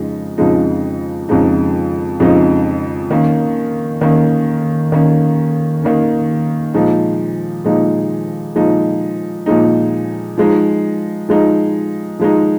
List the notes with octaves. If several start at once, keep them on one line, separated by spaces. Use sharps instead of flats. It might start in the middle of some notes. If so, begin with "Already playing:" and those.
Already playing: F2 C#3 F3 G#3 D#4
F2 C#3 F3 G#3 D#4
F2 C#3 F3 G#3 D#4
F2 C#3 F3 G#3 D#4
D#3 A#3 C#4
D#3 A#3 C#4
D#3 A#3 C#4
D#3 A#3 C#4
A#2 F3 G#3 D#4
A#2 F3 G#3 D#4
A#2 F3 G#3 D#4
A#2 F3 G#3 D#4
F3 G#3 D#4
F3 G#3 D#4
F3 G#3 D#4